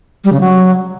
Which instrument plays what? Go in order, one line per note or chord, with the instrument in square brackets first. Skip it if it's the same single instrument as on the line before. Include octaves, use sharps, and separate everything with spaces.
[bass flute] G3
C#3
F#3